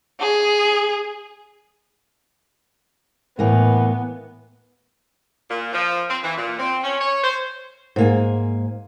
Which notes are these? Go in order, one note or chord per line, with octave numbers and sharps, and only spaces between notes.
G#4
A2 E3 A#3 B3
A#2
F3
C4
E3
A#2
C4
C#4
C#5
C5
G#2 A#3 G#5